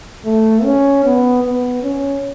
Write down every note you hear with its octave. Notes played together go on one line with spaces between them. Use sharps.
A3
C#4
B3
B3
C#4